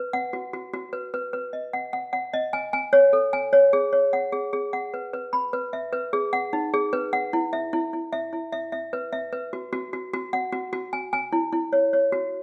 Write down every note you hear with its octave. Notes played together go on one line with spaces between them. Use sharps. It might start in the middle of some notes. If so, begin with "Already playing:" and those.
Already playing: B4
F#5
F#4
F#4
F#4
B4
B4
B4
D#5
F#5
F#5
F#5
D#5
G#5
G#5
C#5
A4
G#5
C#5
G#4
C#5
F#5
G#4
G#4
F#5
B4
B4
B5
B4
E5
B4
G#4
F#5
D#4
G#4
B4
F#5
E4
E5
E4
E4
E5
E4
E5
E5
B4
E5
B4
F#4
F#4
F#4
F#4
F#5
F#4
F#4
G#5
G#5
E4
E4
C#5
C#5
F#4